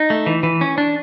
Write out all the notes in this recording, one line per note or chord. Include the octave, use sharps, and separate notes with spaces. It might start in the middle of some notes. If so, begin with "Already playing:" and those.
Already playing: D#4
A3
E3
E3
C#4
D4